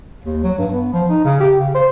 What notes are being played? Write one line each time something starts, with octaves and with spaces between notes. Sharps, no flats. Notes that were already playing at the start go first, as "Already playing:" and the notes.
D#2
F#3
G2
B3
F3
D#4
C#3
G4
C#3
C5